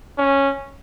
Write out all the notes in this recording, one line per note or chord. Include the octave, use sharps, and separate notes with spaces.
C#4